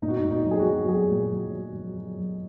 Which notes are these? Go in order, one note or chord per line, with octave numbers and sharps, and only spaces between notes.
A#2 D#4
F#4
D#4
A#2
D#4
F#3
G#4
F#4
F#3
F#3 G#4
A#2
F#3
F#3
F#3
F#3
F#3